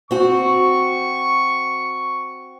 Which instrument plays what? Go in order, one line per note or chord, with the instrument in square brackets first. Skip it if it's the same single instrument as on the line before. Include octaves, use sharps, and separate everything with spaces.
[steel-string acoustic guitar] C4 F#4 [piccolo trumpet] C#6